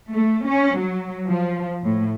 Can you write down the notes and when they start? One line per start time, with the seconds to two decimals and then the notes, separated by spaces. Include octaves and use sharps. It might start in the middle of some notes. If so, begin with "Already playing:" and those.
0.11 A3
0.46 C#4
0.77 F#3
1.27 F3
1.83 A2